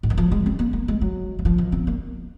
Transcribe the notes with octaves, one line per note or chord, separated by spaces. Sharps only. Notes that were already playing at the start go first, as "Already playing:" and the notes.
G#2
D#3
F3
G#3
C4
A#3
A#3
G#3
F#3
F#3
F3
D#3
C4
A#3